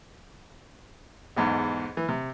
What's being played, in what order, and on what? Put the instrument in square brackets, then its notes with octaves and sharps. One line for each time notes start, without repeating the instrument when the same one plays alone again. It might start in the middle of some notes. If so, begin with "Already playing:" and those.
[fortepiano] B1 E2 G#2
E3
C3